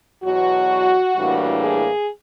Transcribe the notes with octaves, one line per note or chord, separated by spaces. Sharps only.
E2 B2 F#3 F#4
A2 E3 G3 A#3 D4
G#4